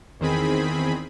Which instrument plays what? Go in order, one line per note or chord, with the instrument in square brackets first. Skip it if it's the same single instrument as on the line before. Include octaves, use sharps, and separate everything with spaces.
[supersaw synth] E2 D#3 C4 G#4 B5